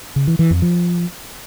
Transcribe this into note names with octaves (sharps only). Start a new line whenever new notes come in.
C#3
E3
E3
F2
F3